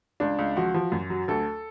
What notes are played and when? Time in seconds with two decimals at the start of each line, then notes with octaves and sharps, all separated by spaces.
0.20 C#2 D4
0.39 C#2
0.57 F3 F#4
0.74 F3
0.92 F#2
1.10 F#3
1.28 D2 A4